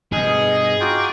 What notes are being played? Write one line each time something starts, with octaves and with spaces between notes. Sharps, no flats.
G2 B2 G#4 D#5
D#4 F4 F#4 G5 A#5 D6